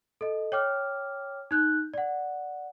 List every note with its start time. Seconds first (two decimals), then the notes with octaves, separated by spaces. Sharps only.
0.21 A4 D#5
0.52 C#5 G5 D6 F6
1.51 D#4 F#6 G6
1.94 D5 F#5